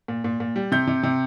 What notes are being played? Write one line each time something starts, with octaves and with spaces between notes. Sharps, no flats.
A#2
A#2
A#2
G3
C3 G6
C3
C3